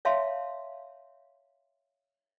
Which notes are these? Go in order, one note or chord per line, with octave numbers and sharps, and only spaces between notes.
C#5 E5 F5 A5 C6